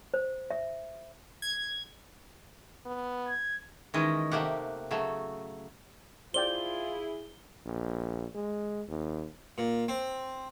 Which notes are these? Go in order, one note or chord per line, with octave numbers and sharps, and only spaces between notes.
C5
E5
G#6
B3
G#6
D#3 E3 G#3 C#4 D#5
C3 A3 A#3 G4 F#5
C#3 F#3 A3
E4 F4 G#4 C5 D5 G5 G7
A#1
G#3
D#2
A#2
C4